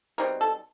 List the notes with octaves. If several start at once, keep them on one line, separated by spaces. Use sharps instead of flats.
B2 G3 C4 D#4 A#4
A4